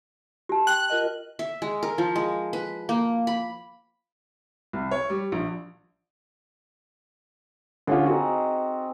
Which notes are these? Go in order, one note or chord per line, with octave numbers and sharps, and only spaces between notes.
G4 A5
G5 F#6
F4 A#4 D#5
E5
G#3
A#4
F3
G#3
B4
A#3
B5
C2
C#5
G3
A#1
D3 C#4 F4 G#4
C4 D#4 F#4 A4